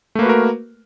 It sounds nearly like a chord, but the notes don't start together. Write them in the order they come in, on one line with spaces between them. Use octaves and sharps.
A3 A#3 B4 F#4 A#4